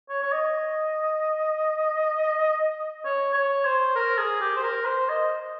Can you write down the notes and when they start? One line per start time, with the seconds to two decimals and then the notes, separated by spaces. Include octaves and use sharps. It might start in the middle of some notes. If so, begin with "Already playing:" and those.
0.09 C#5
0.23 C#5
0.32 D#5
3.05 C#5
3.34 C#5
3.64 C5
3.96 A#4
4.18 G#4
4.41 G4
4.56 C5
4.63 A#4
4.86 C5
5.09 D#5